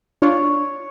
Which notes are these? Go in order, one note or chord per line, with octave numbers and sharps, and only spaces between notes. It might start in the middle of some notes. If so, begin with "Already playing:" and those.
D4 F4 C#5